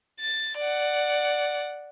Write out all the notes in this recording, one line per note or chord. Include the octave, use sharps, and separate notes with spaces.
A6
D5 F#5